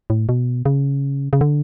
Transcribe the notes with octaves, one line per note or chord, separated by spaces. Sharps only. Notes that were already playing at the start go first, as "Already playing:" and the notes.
A2
B2
C#3
C#3
D3